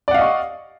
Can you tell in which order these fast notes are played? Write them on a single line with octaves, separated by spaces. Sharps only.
D5 F#5 F5 D#5 C#6